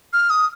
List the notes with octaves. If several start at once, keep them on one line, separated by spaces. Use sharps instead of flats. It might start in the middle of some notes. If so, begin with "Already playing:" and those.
F6
D#6